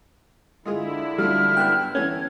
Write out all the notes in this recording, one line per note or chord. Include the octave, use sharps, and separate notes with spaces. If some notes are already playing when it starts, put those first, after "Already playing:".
D3 G#3 E4 F4 G#4
F#3 G3 A3 F4 F6
G2 B3 G5 F#6
E3 A3 B3 C#4 G#6